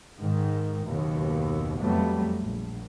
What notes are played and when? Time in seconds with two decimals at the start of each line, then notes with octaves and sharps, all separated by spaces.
0.20 G#2 D#3
0.87 F#1 D#2 B2
1.78 F2 F#3 G3 A3 B3
2.42 A#1